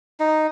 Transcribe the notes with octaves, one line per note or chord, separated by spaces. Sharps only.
D#4